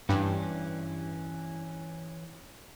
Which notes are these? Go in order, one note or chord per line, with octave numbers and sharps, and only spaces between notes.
G2 E3 C#4